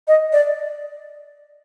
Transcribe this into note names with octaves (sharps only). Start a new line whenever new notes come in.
D#5
D5